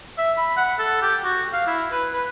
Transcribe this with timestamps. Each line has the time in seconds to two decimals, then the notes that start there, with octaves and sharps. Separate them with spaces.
0.18 E5
0.38 B5
0.57 F#5
0.79 A4
1.02 G4
1.24 F#4
1.53 F5
1.67 E4
1.92 B4
2.14 B4